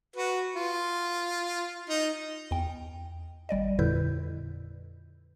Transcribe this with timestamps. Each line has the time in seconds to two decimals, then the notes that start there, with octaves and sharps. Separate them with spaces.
0.16 F#4 B4
0.56 F4
1.89 D#4
2.51 E2 G5
3.49 G#1 G3 D5 D#5
3.79 F2 A#2 D3 E4 B4 G6